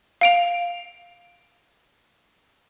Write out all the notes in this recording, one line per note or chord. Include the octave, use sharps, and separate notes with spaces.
F5 D7 F7